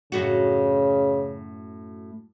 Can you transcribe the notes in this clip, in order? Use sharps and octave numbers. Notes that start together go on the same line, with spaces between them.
F#2 A2 C#3 F#4